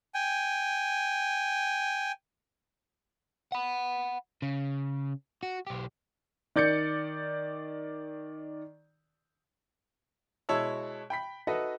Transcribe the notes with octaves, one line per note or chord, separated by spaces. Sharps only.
G5 G#5
F#5 B5
C#3
F#4
B1 G4
D#3 D5 G6 A6 C#7
B2 G#3 E4 C#5 A5 E6
G5 B5 B6
D#4 F#4 A4 B4 D#5 E5